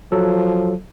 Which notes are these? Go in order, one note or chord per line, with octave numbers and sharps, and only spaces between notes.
F3 F#3 A4